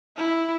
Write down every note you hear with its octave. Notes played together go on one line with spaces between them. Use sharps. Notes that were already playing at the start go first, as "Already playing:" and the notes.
E4